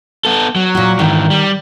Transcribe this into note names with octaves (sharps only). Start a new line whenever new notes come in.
B3 A4
F#3
A#2 F#4
G#2 D#3 E3
G3